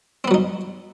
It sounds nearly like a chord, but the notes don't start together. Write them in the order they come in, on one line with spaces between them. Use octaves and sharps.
C4 B3 F#3 D#4